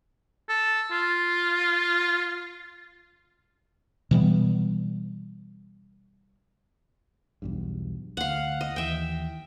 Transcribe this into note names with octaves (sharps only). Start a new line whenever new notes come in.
A4
F4
B2 E3 G3 B3
B1 E2 G2
D2 F5 F#5
D#5
D#2 E3 E5 G5